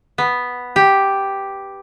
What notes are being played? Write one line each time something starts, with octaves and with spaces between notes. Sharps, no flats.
B3
G4